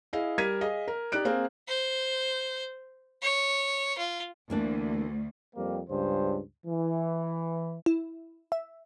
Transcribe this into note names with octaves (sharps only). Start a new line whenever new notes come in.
E4 G#4 D#5 F5
G3 A#4 G#6 B6 D#7
G#4 D#5 F5
A#4
D#4 G4 D5 F#6 D7
A#3 C4 G#4
C5
C#5
F4
D2 E3 A#3 D4
F2 G3 A#3 C4
C#2 G2 C#3 G3 C5
E3
E4
E5